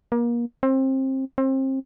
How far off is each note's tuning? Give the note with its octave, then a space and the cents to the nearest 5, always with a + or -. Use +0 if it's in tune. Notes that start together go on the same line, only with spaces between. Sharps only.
A#3 +30
C4 +25
C4 +30